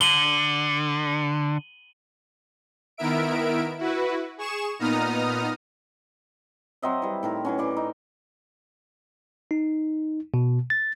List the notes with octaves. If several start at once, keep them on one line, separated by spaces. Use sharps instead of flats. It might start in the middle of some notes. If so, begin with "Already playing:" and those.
D3 D#7 F#7 G7
D#3 B3 E4 A#4 E5 D7
E4 F#4 B4
G#4 C#6 E7
A#2 B3 D#4 A#5 D#6 F6
F#3 C4 D#5 E5
E3 G3
A2 D#3 A#4
E3 F#3 C#4
E3 D5 C#6
D#4
D#4
B2
A6